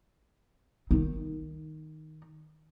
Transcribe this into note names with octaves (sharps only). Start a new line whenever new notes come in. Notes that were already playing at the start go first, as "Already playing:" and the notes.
D#3 D#4